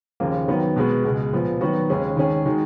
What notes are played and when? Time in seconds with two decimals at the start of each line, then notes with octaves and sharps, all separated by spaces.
0.20 D#2 C#3 F3 A#3 F4
0.48 D#3 F#3 B3
0.76 B2 G#3 B3 F#4
1.05 C#2 B2 G#3
1.33 A#2 F3 B3
1.61 D#3 F#3 B3 F#4
1.90 D#2 C#3 G#3 C#4 G#4
2.17 D#3 G#3 C#4 G#4
2.45 D#3 G#3 D#4 F#4